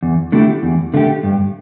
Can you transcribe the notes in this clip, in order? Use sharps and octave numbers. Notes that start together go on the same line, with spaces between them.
E2
D3 A3 E4 G4
E2
D3 A3 E4 G4
G2